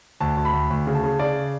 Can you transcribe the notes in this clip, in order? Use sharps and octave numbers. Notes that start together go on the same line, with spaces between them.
D2 A5
D2
B5
D2
D2
C#3
A5
C#3
C#3 D5